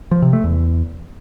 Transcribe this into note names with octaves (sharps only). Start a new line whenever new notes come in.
F3
C3
A3
E2